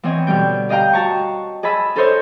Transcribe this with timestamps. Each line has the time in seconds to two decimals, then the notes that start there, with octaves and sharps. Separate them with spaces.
0.03 E3 B3 C4 C#5 D#5
0.27 B2 D3 G3 G5
0.69 G4 D#5 F5 G5 A#5
0.93 F#4 A5 A#5 C#6
1.63 G#4 D#5 A5 B5 E6
1.96 D#4 A4 A#4 C5 C#5 D#5